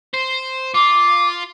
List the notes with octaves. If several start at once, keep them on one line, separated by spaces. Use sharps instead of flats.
C5
F4 D6